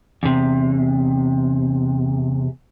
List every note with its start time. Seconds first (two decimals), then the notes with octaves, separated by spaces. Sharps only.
0.23 E2 C3